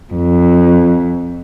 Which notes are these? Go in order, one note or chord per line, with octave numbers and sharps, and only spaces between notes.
F2